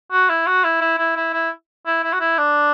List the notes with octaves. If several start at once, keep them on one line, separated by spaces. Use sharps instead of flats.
F#4
E4
F#4
E4
E4
E4
E4
E4
E4
E4
F#4
E4
D4